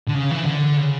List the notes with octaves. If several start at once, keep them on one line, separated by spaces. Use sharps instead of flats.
D3
C#3
E3
D3
C#3